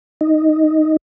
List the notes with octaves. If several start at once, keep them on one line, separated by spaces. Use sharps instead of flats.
D#4